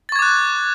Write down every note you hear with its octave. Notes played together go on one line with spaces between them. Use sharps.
C#6 D6 F#6 G#6 A6